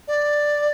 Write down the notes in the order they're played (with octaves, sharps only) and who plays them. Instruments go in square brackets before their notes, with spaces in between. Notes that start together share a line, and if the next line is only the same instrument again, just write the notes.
[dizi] D5